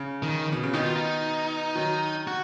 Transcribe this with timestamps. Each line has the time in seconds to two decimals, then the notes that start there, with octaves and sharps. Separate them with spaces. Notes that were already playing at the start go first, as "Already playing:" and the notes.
Already playing: C#3
0.23 D#3
0.52 B2
0.63 C#3
0.74 B2 D#3 D#4
0.85 F4
0.96 D#4
1.76 D#3 F#3
2.27 F#4